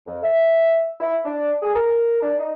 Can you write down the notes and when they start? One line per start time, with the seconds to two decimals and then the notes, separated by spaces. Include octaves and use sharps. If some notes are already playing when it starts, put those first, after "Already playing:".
0.07 F2
0.24 E5
1.01 E4
1.25 D4
1.63 G#4
1.76 A#4
2.23 D4
2.39 D#4